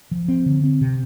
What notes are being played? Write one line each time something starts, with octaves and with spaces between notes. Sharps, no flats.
F3
C4
D3
C4
C3